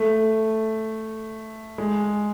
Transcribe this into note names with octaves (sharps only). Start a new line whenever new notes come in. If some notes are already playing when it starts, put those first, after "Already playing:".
Already playing: A3
G#3